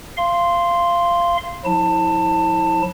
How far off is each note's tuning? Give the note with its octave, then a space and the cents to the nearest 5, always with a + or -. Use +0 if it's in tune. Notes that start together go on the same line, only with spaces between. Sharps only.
F5 -20 C6 +0
F3 +40 E4 -30 A5 +20